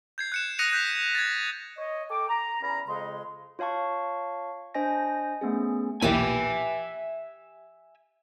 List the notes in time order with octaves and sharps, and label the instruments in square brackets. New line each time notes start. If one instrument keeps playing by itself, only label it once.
[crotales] G6 G#6 C7
F#6 C#7 E7
D#6 F#6 A#6 C#7 D#7 F7
F#6 G6 B6 F7
G#6 A6
[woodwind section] C#5 D#5
A4 G5 D6
A#5
E2 C#4 A#5 B5
F2 C#3 G#3 C6
[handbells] F4 C#5 F5 A5 C#6
D4 C5 D#5 G#5 A#6
A3 B3 C#4 G#4
[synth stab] B1 E2 A#2 [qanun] G4 A5 B5 [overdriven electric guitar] E5 G#5